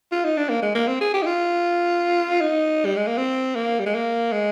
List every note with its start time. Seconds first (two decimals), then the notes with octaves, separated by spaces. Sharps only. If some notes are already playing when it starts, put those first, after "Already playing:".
0.12 F4
0.24 D#4
0.37 D4
0.50 A#3
0.62 G#3
0.75 A#3
0.88 C4
1.01 G#4
1.14 G4
1.22 D#4
1.26 F4
2.41 D#4
2.86 G3
2.96 G#3
3.07 A#3
3.18 C4
3.55 A#3
3.79 G3
3.86 G#3
3.94 A#3
4.32 G#3